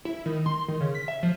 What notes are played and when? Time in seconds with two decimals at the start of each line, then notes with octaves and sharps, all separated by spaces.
0.05 E4
0.26 D#3
0.46 C6
0.68 D#3
0.80 C#3
0.95 B6
1.08 E5
1.23 F3